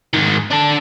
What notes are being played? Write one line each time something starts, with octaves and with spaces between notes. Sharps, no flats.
G#2 D#3
D4 A4